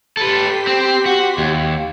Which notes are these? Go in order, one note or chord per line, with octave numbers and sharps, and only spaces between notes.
G4 A4 B4 C6 B6
C4
F#4
D#2